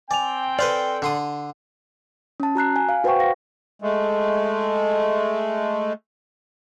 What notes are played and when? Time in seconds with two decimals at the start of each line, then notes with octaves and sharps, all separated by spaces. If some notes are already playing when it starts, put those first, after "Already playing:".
0.11 C4 D5 G5 G#5 F7
0.59 A4 B4 C5 D5 F5
1.02 D3 C6 D#6
2.40 C#4 A5
2.55 F#4 A#5 F#6 C7
2.76 G#5
2.89 F5
3.04 F#4 B4 C5 F#5 G5 C#6
3.20 F5 A#6
3.82 G#3 A3